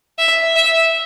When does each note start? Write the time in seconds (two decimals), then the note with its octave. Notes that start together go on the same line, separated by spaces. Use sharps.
0.19 E5
0.56 E5